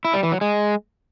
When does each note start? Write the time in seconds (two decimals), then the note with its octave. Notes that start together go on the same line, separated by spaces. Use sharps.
0.05 E4
0.14 G3
0.23 E3
0.32 F#3
0.41 G#3